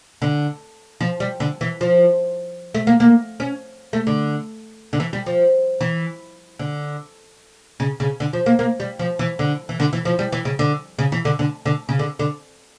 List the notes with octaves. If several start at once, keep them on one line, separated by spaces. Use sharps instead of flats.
D3
F3
G3
D3
E3
F3
A3
A#3
A#3
C#4
A3
D3
D3
E3
G3
F3
E3
D3
C#3
C#3
D3
F3
A#3
A#3
G3
F3
E3
D3
E3
D3
E3
F3
G3
E3
C#3
D3
C#3
E3
D3
D3
D3
C#3
D3
D3